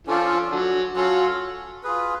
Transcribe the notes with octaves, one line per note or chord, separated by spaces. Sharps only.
D3 F3 C#4 F4 A4 D5
D3 F#3
F#3 C#4 F4 A4 F5
F4 G#4 B4